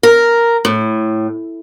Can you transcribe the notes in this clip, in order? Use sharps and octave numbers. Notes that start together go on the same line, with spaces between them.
A#4
A2